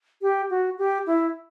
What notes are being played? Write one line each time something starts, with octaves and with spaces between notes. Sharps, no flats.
G4
F#4
G4
E4